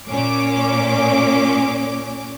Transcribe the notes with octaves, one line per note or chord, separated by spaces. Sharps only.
A#2 C#4 D6